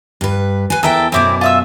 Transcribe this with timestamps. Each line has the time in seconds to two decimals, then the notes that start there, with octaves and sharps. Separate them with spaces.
0.21 G2 B4
0.70 B4 G#5
0.83 E2 E4 A4 A#4 E5 G5
1.12 F#2 B2 A3 C4 E4 D6
1.41 F4 E5 E6